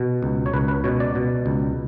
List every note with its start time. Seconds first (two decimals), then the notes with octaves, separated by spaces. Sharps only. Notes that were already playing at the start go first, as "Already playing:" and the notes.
Already playing: B2
0.23 C#2
0.46 C#5
0.53 C#2 B4
0.68 B4
0.84 B2 C#5
1.00 D5
1.15 B2
1.46 C#2